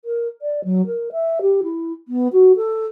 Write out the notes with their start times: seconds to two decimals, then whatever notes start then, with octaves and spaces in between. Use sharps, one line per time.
0.04 A#4
0.41 D5
0.64 F#3
0.86 A#4
1.12 E5
1.41 G4
1.63 E4
2.08 B3
2.32 F#4
2.56 A4